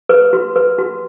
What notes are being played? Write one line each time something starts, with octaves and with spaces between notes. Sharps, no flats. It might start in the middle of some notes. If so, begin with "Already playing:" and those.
B4
F#4
B4
F#4